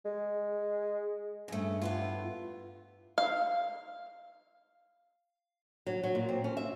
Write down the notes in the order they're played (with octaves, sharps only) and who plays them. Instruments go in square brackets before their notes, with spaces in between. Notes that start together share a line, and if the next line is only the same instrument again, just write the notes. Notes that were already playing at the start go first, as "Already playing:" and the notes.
[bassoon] G#3
[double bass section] G2 [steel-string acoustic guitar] C#3 A3
[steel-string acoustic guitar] A2 B3 F4
[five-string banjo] F5
[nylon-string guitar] F#3
F#3
A#2
C4
C#4
E5